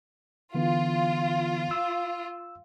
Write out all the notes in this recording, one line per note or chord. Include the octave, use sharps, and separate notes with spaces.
D3 E3 B3 F4
E6